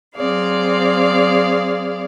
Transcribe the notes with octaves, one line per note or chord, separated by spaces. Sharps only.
F#3 C4 G#4 D5 F5